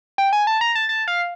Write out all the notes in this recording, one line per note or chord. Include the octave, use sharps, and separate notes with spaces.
G5
G#5
A5
A#5
A5
A5
F5